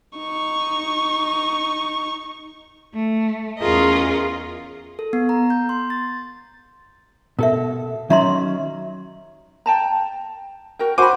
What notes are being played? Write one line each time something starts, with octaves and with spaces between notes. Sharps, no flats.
D#4 C#6
A3
E2 C#4 F4 G#4 A#4 D#5
A4
B3
A#5
G6
C6
A6
B2 A4 A#4 E5
D#3 F#3 C#4 E5 A#5 C6
G5 A5 A#5
F#4 A#4 G5
F#4 C5 G#5 B5 D6